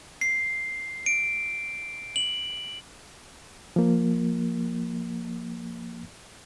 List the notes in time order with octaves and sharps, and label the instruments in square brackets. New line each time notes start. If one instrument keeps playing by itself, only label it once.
[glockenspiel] C7
D7
F#7
[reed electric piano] F3 A#3